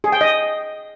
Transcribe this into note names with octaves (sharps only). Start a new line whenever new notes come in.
G#4
G5
D#5